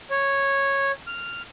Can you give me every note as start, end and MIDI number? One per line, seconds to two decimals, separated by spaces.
0.10 0.92 73
1.07 1.42 89